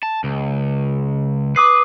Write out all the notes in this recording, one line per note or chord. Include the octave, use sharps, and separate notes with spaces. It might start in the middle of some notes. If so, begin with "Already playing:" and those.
A5
C#2
B4 D6 D#6 C7